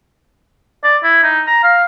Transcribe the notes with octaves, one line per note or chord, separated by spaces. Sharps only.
D5
E4
D#4
A#5
F5